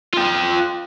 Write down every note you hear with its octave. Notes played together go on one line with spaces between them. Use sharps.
F4 G5